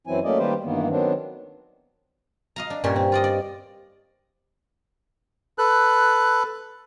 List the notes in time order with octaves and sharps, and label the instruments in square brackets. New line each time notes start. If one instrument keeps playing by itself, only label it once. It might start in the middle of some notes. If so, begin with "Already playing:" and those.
[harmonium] F#2 E3 F#3 C4 E4 G#5
F#3 A3 A#3 C#4 D5 D#5
D#3 G3 A#3 G4 B4 C5
G2 D#3 E3 A#3 B3
D#3 F#3 B3 C4 D4
[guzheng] D#5 F5 A#5
D4
G2 A#2 C#4 C6
C4
F4 D5 D#5
D5
[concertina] A4 B4 F#6